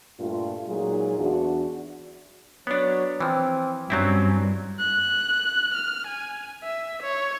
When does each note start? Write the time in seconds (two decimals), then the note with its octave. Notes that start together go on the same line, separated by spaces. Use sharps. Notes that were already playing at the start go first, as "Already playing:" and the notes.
0.20 G2 A#2 A3 F4
0.68 A#2 F#3 G#3 D#4 F4 G#4
1.18 E2 D4 F#4
2.67 F#3 B3 D4 C#5
3.20 E3 F3 C4
3.90 G2 F#3 C4 C#4 E4
4.79 F#6
5.74 F6
6.07 G#5
6.64 E5
7.02 C#5